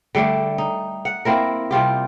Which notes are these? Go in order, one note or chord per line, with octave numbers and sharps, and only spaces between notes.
D3 G3 A3 D4
D#4
F#5
A#3 C4 E4 A#4
C3 G3 F4 G4